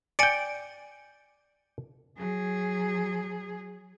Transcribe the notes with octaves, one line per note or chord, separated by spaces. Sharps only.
D5 G5 G#5 C#7 D7
F#3 G#4